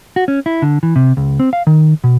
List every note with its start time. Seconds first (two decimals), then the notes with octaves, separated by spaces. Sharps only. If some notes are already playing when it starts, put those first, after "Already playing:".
0.16 F#4
0.28 C#4
0.46 E4
0.62 D3
0.83 E3
0.96 C3
1.17 C#2
1.40 C4
1.53 F5
1.67 D#3
2.04 B2